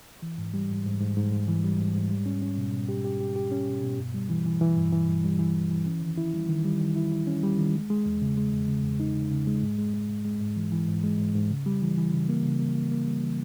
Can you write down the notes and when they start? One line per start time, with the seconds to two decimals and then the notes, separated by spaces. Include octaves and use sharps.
0.22 E3
0.38 G#2
0.54 G3
0.70 G#2
0.86 G#2
1.00 G#2
1.16 G#2
1.32 G#2
1.48 E3
1.64 G3
1.79 G#2
1.94 G#2
2.11 G3
2.26 C#4
2.42 C#4
2.57 B2
2.73 B2
2.89 G4
3.05 G4
3.20 G4
3.36 G4
3.52 C#4
3.67 B2
3.83 B2
3.98 G2
4.14 G3
4.30 E3
4.46 E3
4.61 E3
4.76 G2
4.92 E3
5.08 G2
5.24 G3
5.39 E3
5.55 E3
5.71 E3
5.86 C#4
6.02 D#3
6.18 E4
6.34 G3
6.49 D#3
6.65 G3
6.81 D#3
6.96 E4
7.12 E4
7.27 C#4
7.43 G3
7.58 D#3
7.74 G#3
7.90 G#3
8.06 E2
8.22 C#3
8.37 G#3
8.52 E2
8.68 C#3
8.84 E2
9.00 D#4
9.15 C#3
9.31 C#3
9.47 G#3
9.62 G#2
9.78 G#3
9.94 G#3
10.09 G#2
10.25 G#3
10.41 G#2
10.56 E3
10.72 E3
10.88 G#2
11.03 G#3
11.19 G#2
11.35 G#2
11.50 C#3
11.66 G3
11.82 E3
11.97 E3
12.13 C#3
12.29 A#3
12.45 C#3
12.60 A#3
12.76 A#3
12.91 A#3
13.07 G3
13.23 E3